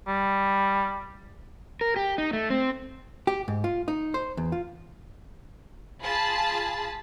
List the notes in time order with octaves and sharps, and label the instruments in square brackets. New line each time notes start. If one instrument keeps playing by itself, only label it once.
[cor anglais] G3
[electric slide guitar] A#4
G4
D#4
A3
C4
[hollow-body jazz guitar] G4
G#2
F4
D#4
C5
E2
F4
[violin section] F4 G#4 A5 B5